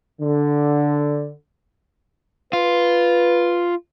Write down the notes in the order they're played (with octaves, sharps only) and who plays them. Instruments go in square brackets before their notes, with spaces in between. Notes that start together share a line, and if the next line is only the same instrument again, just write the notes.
[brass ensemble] D3
[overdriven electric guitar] F4 [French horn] B4